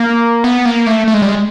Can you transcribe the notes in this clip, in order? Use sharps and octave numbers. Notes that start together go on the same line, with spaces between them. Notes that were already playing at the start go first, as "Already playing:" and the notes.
Already playing: A#3
B3
A#3
A3
A3
G#3
G3
G#3